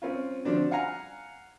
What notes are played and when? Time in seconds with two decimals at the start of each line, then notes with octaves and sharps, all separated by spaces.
0.02 C4 C#4 F4
0.45 D3 F3 C4 D4 F#4
0.71 F5 F#5 G#5 A#5